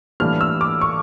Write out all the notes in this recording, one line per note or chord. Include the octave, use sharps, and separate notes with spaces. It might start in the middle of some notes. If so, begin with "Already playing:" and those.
A2 E3 G3 A#3 D4 F6
E6
D6
C#6